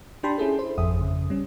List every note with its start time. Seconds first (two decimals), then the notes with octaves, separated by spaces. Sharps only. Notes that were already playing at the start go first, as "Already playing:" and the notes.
0.23 D4 G4 G5 A5 B5 C6
0.38 C#4 E4 G#4 A4
0.59 C5
0.78 G#1 F2 E5 D#6
1.00 F2 C#3
1.30 G3 C#4